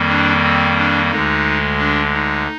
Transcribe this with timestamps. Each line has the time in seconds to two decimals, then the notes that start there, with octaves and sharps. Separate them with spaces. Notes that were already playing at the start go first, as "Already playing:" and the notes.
Already playing: F2 D#3 G3 A#3
0.09 D4
0.43 C4
0.77 D4
1.11 D2 D3 G#3 D#4
1.79 D4
2.14 D#4